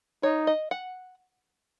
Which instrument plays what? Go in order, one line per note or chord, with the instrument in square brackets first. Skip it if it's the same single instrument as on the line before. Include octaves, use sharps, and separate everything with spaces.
[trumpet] D#4 [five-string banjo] C#5
[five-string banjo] D#5
F#5